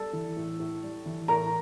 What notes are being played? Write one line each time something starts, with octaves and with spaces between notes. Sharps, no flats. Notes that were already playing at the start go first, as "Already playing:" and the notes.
Already playing: G3 A4 A5
E3
A2
A2
G3
E3
A2 A#4 A#5